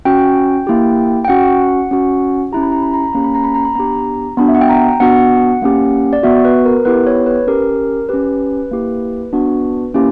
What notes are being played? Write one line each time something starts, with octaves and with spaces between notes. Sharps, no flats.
C#4 F#4 G5
A#3 E4 G4
G5
C#4 F#4 F#5
C#4 F#4
C#4 E4 G4 A#5
B5
A#5
B5
A#5
B5
A#3 C#4 G4 A#5
B5
A#5
B5
A#5
B5
B3 D4 G4 A#5
B3 D4 F#4 B5
E5
F#5
G5
A#5
B3 D4 F#4 F#5
A#3 C#4 G4
D5
B3 F#4 E5
B4
A#4
B3 E4 G4 B4
C#5
B4
C#4 G4 A#4
C#4 G4 B4
A#3 E4 G4
B3 D4 F#4
A#3 C#4 E4 G4